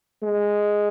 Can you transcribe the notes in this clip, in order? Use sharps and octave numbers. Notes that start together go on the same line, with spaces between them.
G#3